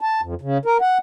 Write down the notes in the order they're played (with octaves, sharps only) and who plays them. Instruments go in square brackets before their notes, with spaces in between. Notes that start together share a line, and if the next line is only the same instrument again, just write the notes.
[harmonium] A5
F2
C#3
A#4
F#5